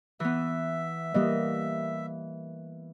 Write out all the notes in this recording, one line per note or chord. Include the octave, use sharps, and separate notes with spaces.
E3 B3 E5
E3 G3 A#3 D#5